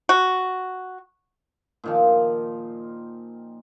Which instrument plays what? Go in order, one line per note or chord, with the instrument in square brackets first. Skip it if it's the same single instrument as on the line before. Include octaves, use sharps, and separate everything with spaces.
[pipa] F#4
[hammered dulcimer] A#2 D#3 F3